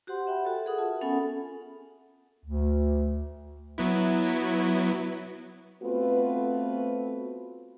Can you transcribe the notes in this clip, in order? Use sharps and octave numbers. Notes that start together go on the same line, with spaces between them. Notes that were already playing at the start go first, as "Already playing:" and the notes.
F#4 G4 C5 F#5 C6
E5 F#5 G5 B5
F#4 A4
G#4 A#4 E5 F#5 D#6
F4 E5 A5
B3 C#4 A4 F#5 G#5 B5
D2
F#3 B3 E4
A3 B3 C4 F4 F#4 B4